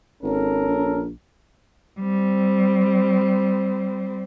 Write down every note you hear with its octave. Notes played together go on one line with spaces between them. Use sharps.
G#1 C#4 A4 A#4
A#1
G3 C4